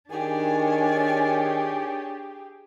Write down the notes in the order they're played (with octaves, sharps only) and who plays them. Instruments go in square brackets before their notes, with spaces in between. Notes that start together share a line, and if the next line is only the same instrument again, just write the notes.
[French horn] D#3 [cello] D4 C#5 [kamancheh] G4 G#4 [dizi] G#5